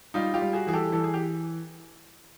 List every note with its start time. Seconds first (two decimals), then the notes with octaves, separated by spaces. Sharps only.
0.14 G3 D#4 F4
0.34 F4 G4
0.41 G3
0.53 F#4 G#4
0.67 E3 G#4
0.73 G4 A4
0.92 E3 A4
1.04 G#4
1.14 G4